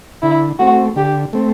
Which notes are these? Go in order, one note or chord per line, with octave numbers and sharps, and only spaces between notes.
D3 E4
A3 C4 F#4
D3 G4
A3 C4